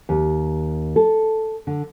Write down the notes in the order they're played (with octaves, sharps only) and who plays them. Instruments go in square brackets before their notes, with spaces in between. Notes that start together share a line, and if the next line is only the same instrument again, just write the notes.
[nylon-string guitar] D#2
A4
D3